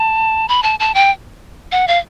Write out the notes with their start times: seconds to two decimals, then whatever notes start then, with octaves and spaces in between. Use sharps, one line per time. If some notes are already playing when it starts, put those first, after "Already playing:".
Already playing: A5
0.48 B5
0.63 A5
0.80 A5
0.94 G5
1.72 F#5
1.88 F5